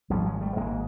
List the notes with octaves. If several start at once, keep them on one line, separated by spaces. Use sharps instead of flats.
G#1 G#2 F3 G3
F#3 G#3
G3 A3
G#1 G#2 G#3 A#3